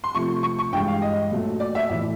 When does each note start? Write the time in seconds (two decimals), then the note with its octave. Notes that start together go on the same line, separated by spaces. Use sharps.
0.04 C6
0.14 C3 F3 A3 C#6
0.43 C#6
0.59 C#6
0.72 G2 E3 G#3 G5
0.88 F5
1.02 D#5
1.31 A#2 F#3 A3
1.60 D5
1.75 E5
1.90 A2 E3 A3 E5